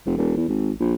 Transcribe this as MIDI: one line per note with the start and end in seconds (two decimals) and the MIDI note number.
0.06 0.13 29
0.17 0.34 28
0.36 0.44 40
0.49 0.71 32
0.80 0.94 34